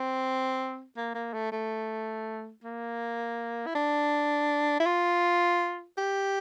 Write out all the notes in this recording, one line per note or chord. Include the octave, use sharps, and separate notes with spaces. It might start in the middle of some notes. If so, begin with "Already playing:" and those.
Already playing: C4
A#3
A#3
A3
A3
A#3
E4
D4
E4
F4
G4